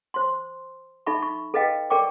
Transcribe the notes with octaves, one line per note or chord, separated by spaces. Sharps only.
C5 C6
D#4 A4 E5 B5 C#6
C#6
A4 B4 D#5 F5 G5
A4 A#4 D5 G5 C#6 D6